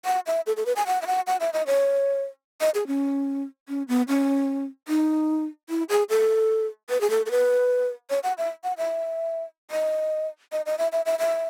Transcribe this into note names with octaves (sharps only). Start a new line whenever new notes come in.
F#5
E5
A4
A4
B4
G#5
F#5
E5
F#5
F#5
E5
D#5
C#5
D#5
G#4
C#4
C#4
B3
C#4
D#4
E4
G#4
A4
B4
G#4
A4
A4
B4
C#5
F#5
E5
F#5
E5
D#5
D#5
D#5
E5
E5
E5
E5